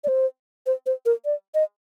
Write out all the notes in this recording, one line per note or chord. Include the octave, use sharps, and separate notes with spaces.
D5
C5
C5
C5
A#4
D5
D#5